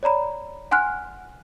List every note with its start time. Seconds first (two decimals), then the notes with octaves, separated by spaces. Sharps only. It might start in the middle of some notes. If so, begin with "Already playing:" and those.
0.03 C#5 D5 A#5 B5
0.71 F#5 G#5 C6 F6 F#6